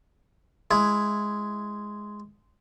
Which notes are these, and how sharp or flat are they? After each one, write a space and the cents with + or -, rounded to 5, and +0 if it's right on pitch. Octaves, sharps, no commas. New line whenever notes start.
G#3 +0 E4 +10